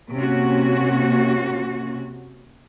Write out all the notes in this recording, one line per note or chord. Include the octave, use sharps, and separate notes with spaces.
C3 A#3 C#4 F#4